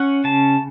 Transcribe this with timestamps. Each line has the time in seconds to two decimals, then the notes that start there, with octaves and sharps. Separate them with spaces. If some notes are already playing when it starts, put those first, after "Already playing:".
Already playing: C#4 F#5
0.24 C#3 A5